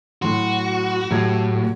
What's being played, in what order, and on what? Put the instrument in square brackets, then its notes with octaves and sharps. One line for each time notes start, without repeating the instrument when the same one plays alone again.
[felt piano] A2 F#3 C6 [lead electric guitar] F#4
[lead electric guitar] A2 [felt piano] F#3 G4 G#6